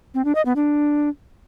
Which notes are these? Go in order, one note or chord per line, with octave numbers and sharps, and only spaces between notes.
C4
D4
D#5
B3
D4